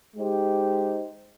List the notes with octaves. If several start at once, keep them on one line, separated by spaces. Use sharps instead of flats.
G#3 D#4 G4 C5